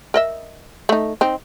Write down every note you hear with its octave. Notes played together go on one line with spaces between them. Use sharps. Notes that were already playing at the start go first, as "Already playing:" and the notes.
A#4 D#5 E5
A3 D#4
C4 D#4